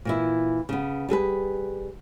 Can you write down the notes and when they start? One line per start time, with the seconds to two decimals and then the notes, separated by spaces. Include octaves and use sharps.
0.05 A#2 E3 E4
0.69 C#3 B3
1.09 G3 G#4 A4 B4